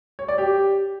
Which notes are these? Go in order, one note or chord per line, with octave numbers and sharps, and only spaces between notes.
C#5
D5
G4